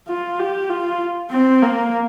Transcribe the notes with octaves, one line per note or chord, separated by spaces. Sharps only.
F4
G4
F4
C4
A#3